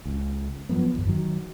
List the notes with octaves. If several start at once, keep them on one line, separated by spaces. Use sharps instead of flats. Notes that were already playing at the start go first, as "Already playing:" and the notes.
C#2
F3 F#3 A#3 B3
D1 G1 F2
D#3 F#3